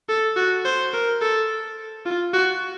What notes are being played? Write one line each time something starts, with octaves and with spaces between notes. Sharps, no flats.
A4
F#4
C5
A#4
A4
F4
F#4